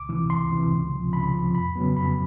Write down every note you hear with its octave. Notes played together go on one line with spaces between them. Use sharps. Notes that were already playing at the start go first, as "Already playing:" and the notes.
Already playing: C#2 D6
C3 E3
C#2 C6
C3 E3
C#2
C3 F3
C#2 B5
C3 F3
F2 B5
C#3 F#3 B3
F2 B5